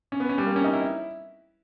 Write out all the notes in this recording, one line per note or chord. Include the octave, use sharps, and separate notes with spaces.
C#4
B3
C#4
G3
A#3
C#4
D#4
E4